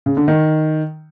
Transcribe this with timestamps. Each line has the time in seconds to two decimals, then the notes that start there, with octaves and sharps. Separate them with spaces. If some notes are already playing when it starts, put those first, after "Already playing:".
0.06 C#3
0.17 D3
0.28 D#3